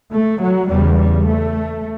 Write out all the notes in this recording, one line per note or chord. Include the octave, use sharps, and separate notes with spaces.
A3
F#3
E2 C#3 G3
G3
A3